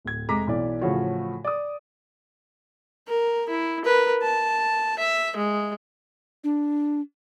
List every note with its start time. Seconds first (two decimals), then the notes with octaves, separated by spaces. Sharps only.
0.05 D1 G#6
0.29 F1 G#3 A#5 D6 B6
0.47 B1 E3 D5
0.81 A2 C#3 E3 F3 F#4 C#5
1.44 D5 D#6
3.08 A#4
3.49 E4
3.85 A#4 B4
4.23 A5
4.99 E5
5.37 G#3
6.44 D4